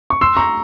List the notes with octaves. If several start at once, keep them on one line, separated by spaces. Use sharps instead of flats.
C#6
C6 E6
A#5 C#6